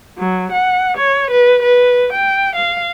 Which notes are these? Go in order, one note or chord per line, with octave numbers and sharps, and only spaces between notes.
F#3
F#5
C#5
B4
B4
G5
F5